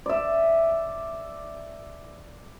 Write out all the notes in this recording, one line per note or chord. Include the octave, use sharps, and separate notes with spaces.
D5 E5